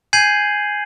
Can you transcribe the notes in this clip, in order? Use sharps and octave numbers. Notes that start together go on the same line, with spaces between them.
G#5 G6 G#6 C7 D#7 F#7